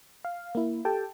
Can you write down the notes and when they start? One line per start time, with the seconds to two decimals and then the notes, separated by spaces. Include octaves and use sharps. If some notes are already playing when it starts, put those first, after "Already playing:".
0.25 F5
0.55 A#3 E4
0.85 G4 A4 G5 A5